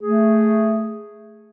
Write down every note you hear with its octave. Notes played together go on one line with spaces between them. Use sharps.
A3 G#4